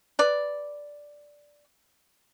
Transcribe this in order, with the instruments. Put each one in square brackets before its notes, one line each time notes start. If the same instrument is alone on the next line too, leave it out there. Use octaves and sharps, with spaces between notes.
[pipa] B4 D5